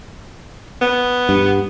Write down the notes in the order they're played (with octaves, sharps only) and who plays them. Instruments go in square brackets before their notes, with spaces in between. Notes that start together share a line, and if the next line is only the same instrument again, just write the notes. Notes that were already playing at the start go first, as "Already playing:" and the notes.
[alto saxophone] B3
[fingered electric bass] G2